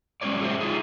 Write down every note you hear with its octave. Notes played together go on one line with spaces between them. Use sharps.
F#3 G#3 C#4 B4 C#5 D5
F#4 G#4 C5 E5
D#4 F4 G#4